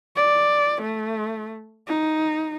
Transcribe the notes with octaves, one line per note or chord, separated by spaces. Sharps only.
D5
A3
D#4